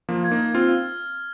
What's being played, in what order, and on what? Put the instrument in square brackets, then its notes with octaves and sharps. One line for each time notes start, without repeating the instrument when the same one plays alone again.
[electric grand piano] F3 A#3
[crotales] G#6
[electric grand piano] A#3 D#4
[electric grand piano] C4 F4 [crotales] F6